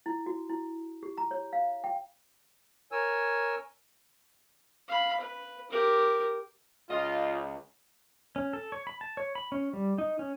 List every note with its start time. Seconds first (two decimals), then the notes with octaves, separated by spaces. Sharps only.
0.06 E4
0.26 F#4
0.50 E4
1.03 G4
1.18 A#5
1.31 C#5
1.53 F5
1.84 G5
2.92 A#4 C#5 G#5 E6
4.88 F5 B5
5.20 B4
5.70 G4 A#4
6.90 C#2 F4 D#5
8.36 C#4
8.53 A4
8.72 C#5
8.87 B5
9.01 A5
9.17 C#5
9.35 B5
9.52 C#4
9.73 G3
9.98 D#4
10.19 C#4